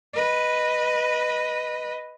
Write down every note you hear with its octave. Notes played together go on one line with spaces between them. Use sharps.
B4 D#5